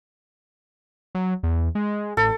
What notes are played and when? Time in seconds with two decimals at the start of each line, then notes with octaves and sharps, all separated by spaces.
1.15 F#3
1.43 E2
1.75 G#3
2.17 A1 A4